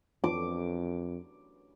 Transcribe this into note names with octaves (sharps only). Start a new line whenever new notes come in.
F2 D6